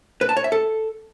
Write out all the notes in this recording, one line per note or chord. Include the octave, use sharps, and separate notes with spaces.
B4
A5
C#5
E5
A4